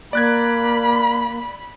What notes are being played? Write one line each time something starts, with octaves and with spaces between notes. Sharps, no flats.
A#3 D5 B5 F#6 G#6